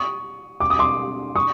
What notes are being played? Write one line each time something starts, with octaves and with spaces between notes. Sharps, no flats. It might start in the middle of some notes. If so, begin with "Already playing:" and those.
Already playing: C#6 D#6
D6
D#6
C6 D6
C#6 D#6